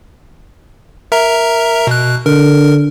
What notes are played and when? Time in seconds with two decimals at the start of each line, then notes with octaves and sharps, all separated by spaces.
1.12 A#4 E5 A#5
1.87 B2 F#6
2.26 D3 A#4